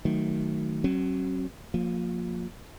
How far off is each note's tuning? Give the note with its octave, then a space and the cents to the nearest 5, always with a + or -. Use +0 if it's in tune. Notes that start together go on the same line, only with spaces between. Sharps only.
D#3 +0 F#3 +0 A3 -5
F#3 +20 C#4 -40
F3 +20 A#3 -10